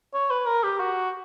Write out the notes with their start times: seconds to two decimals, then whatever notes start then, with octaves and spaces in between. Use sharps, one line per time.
0.14 C#5
0.31 B4
0.46 A#4
0.63 G4
0.80 F#4